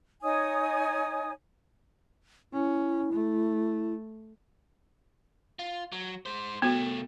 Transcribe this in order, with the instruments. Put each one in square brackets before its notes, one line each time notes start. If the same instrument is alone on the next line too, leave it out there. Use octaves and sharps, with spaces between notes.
[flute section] D#4 C#5 G#5 D#6
[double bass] C#4 [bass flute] E4
[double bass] A3
[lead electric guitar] F4
F#3
G#3 C5
[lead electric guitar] C2 A3 [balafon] B3 F#4